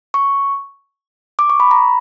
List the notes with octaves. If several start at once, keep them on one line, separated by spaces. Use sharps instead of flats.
C#6
D6
C#6
B5
A#5